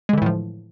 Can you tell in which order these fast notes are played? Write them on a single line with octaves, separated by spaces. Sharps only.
G#3 D3 E3 A2 F3